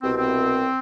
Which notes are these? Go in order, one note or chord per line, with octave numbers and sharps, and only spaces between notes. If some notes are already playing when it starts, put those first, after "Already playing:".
C2 B2 C4
C4